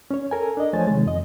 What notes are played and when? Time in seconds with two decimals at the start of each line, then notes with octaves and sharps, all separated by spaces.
0.11 C#4 C#5
0.31 A4 A#4 G#5
0.57 D4 D#5
0.73 F3 A3 C5 C#5 G#5 A6
0.87 C3 D#3 G#3
1.06 F2 D#5